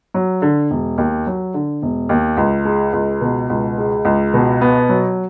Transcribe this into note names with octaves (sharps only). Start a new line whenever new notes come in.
F#3
D3
E1
D#2
F#3
D3
E1
D#2
C#2
G#3
C#2
B2
C#2
G#3
C#2
B2
B3
F#3